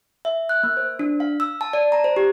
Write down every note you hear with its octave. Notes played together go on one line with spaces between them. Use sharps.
E5
F#6
A#3
C5
D4
F5
E6
A5
D5
A#5
C5
G4